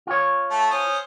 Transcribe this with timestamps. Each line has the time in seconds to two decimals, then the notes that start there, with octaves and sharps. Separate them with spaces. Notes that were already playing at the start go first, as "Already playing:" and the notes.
0.07 F4 C#5
0.50 A3 A5
0.70 C#4 C5 D#6